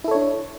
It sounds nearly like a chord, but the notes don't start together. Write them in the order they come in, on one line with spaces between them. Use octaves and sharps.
E4 A4 C#5 D4